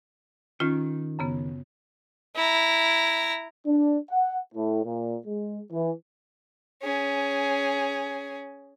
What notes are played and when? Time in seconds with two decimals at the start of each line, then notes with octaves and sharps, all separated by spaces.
0.60 D#3 C#4 F4
1.19 F#2 C#3 B3
2.36 E4 A#5
3.67 D4
4.11 F#5
4.55 A2
4.85 A#2
5.27 G#3
5.72 E3
6.82 C#4 G#4